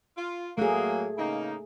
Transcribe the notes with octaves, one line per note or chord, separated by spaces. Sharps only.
F4
F#3 A3 A#3 G#4
C#3 A#3 D#4